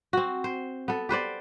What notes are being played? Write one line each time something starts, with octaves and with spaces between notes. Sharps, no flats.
C4 F#4
C5
B3 A4
G4 B4 C5 D5